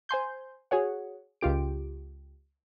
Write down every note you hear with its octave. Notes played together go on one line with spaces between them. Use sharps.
C5 G#5 C6 G6
F#4 G#4 C#5 F#5
C#2 F4 G4 D7